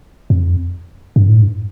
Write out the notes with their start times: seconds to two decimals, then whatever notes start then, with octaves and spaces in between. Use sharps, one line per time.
0.30 F2
1.16 G2
1.29 A2
1.42 G2